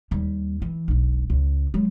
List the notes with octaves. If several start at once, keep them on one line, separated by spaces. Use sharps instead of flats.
D#2 G3
E3
E1 B1
C#2
F#3 G#3